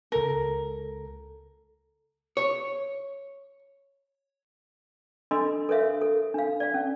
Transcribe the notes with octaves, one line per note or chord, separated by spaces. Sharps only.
C#2 A4 A#4
C#5
D4 A4 D#5 C6 E6
A4 A#4 C#5 E5 F5
A4
D4 F5
D5 F5
C#4